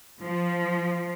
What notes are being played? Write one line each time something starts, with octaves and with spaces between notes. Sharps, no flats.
F3